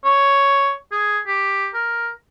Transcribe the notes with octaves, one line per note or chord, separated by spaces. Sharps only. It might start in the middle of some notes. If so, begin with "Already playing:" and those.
C#5
G#4
G4
A#4